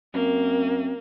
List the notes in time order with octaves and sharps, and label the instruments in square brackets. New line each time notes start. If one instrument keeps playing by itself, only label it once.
[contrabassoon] F#2 [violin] A#3 [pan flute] C4